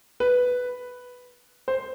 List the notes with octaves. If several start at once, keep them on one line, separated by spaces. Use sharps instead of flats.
B4
C5